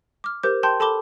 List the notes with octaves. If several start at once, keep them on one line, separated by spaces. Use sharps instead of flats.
D6 F6
G4 A#4 C5 D6 G6
G5 A5 C6 G6
A4 A5 B5 D6 G7